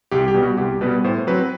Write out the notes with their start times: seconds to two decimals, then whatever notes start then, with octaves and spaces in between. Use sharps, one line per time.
0.11 C2 G4
0.28 G4
0.34 B2 G3 B3
0.43 F#4
0.58 C2 G4
0.81 B2 G3 B3 B4
1.04 A2 C5
1.27 F#3 C4 B4